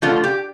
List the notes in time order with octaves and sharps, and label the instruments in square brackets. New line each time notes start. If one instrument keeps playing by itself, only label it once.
[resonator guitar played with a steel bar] D3 F3 A3 F4
G4